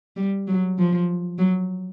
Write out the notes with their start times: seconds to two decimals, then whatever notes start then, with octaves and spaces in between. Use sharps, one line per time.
0.16 G3
0.47 F#3
0.78 F3
1.39 F#3